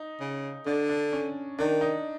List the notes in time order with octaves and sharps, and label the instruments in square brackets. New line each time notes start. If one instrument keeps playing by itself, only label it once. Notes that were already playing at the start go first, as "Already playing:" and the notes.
Already playing: [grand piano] D#4
[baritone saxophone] C#3
[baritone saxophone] D3 [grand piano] D4
[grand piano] D4
C#4
[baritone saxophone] D#3 [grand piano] D4
[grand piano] D#4